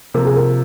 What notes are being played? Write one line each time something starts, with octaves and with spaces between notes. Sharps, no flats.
C3 F3 A#3 F4 A#4
G#4
A#4